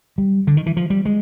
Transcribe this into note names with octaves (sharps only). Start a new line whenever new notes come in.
G3
D3
D#3
E3
F3
G3
G#3